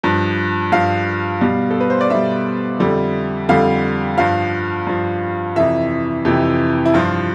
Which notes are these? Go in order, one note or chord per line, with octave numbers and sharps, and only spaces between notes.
G2 F3
G2 F3 F5
B2 G3
A4
B4
C5
D5
B2 G3 E5
F2 D3 G3
F2 D3 G3 F5
G2 F3 F5
G2 F3
F2 C3 E3 E5
F2 C3 E3 G4
E4
G2 F3 F4